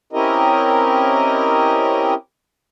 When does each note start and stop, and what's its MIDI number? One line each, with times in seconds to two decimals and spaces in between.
0.13 2.14 60
0.13 2.14 61
0.13 2.14 64
0.13 2.14 67
0.13 2.14 70
0.13 2.14 75